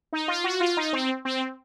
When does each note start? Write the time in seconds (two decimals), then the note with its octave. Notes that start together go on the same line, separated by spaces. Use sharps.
0.13 D#4
0.28 F4
0.44 F#4
0.60 F4
0.77 D#4
0.93 C4
1.25 C4